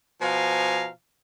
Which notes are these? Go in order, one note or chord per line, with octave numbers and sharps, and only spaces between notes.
B2 F3 C5 F5 G#5 A#5